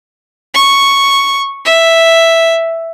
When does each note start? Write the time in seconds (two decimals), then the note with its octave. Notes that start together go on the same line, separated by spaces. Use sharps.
0.54 C#6
1.65 E5